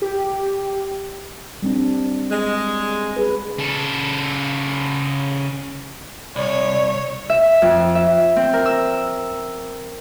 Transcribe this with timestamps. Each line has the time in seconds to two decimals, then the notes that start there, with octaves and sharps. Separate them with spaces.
0.02 G4
1.62 G3 C4 D4
2.31 G#3
3.17 G#4 B4
3.59 C#3 A4
6.36 C2 C#5 D5
7.29 E5
7.62 F2
7.95 E5
8.36 C4
8.53 A#4
8.66 E6